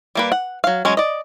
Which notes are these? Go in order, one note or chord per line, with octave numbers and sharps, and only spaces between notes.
G3 A#3 B4
F#5
F#3 F5
F#3 G#3 C#4
D5 D#5